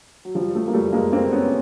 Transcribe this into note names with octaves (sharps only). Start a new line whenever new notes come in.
F#3
F3 G3
G3 A3
A#3
G3 A3
G#3 A#3
A#3 C4
B3 C#4